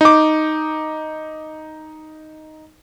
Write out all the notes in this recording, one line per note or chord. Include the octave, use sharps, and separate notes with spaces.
D#4 D6